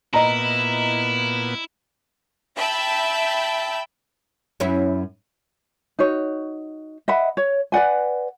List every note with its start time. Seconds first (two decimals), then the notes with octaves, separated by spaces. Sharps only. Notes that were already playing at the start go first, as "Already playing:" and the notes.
0.13 A#2 B3 E4 D#5 A#5
2.57 E5 G5 A5 B5 E6
4.60 F#2 C#4 E4
5.99 D#4 F#4 C#5
7.08 D#5 E5 F#5 B5
7.37 C#5
7.72 B4 D5 F#5 G#5